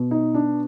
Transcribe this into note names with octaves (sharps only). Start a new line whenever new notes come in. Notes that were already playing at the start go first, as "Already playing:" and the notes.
Already playing: B2
D#4
D4